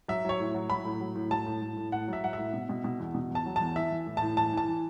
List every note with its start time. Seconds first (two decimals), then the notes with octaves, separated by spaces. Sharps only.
0.08 F#3 E5
0.25 F#3 C#5
0.40 A2
0.54 F#3
0.70 F#3 B5
0.85 A2
1.01 F#3
1.16 A2
1.31 F#3 A5
1.46 A2
1.62 A2
1.77 A2
1.92 A2 F#5
2.08 F#3 E5
2.24 F#3 F#5
2.33 A2 E5
2.53 B2
2.69 B2
2.84 B2
3.00 E2
3.15 B2
3.30 E2 A5
3.46 F#3
3.56 E2 A5
3.76 E3 E5
3.91 E3
4.07 A2
4.17 A2 A5
4.37 E3 A5
4.53 E3 A5
4.68 E3